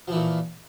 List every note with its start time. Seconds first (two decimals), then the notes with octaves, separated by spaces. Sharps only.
0.08 F3
0.12 E3
0.16 A#2